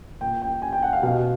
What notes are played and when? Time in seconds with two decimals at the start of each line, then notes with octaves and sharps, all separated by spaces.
0.21 A#2 G5
0.42 G5
0.62 G#5
0.73 G5
0.83 F#5
0.93 F5
1.03 B2 F5